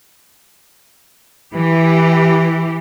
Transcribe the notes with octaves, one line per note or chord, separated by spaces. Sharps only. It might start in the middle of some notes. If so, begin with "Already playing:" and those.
E3 G4